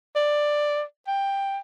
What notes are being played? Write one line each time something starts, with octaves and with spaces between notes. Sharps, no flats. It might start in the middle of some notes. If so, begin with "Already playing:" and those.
D5
G5